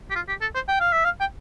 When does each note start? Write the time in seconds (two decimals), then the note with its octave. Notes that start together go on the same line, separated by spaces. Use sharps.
0.11 G4
0.15 F4
0.28 G4
0.41 A4
0.55 C5
0.68 G5
0.80 F5
0.92 E5
1.05 F5
1.21 G5